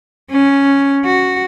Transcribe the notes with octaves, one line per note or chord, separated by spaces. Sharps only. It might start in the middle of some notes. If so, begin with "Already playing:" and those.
C#4
F#4